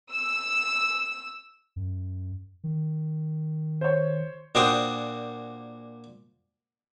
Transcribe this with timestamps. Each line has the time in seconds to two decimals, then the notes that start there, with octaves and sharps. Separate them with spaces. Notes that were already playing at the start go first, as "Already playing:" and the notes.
0.12 E6
1.76 F#2
2.64 D#3
3.81 C5 C#5
4.55 A#2 D4 F#4 C5 G5 D#6